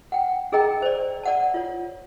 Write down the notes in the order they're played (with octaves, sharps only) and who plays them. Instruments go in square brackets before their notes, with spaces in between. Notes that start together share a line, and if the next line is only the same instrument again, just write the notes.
[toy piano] F#5 G5
D4 G#4 A#4 D#5 G5 A#5
C5 D5
D5 F#5 A5
F4 C#5